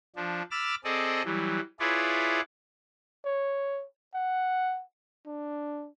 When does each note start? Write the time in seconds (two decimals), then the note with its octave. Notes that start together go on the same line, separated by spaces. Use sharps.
0.16 F3 D4
0.51 B5 D6 E6 F6 A6
0.84 C4 G#4 A4 D5 D#5
1.25 E3 F#3 G3
1.80 E4 F4 G#4 B4 C#5 D5
3.25 C#5
4.15 F#5
5.26 D4